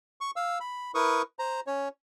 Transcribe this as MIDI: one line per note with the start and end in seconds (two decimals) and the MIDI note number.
0.21 0.31 85
0.36 0.59 77
0.36 0.59 88
0.61 0.91 83
0.95 1.22 64
0.95 1.22 70
0.95 1.22 71
0.95 1.22 85
0.95 1.22 87
1.39 1.60 72
1.39 1.60 82
1.67 1.88 61
1.67 1.88 73